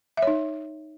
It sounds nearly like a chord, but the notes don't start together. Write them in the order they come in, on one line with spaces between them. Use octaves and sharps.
E5 C#5 D#4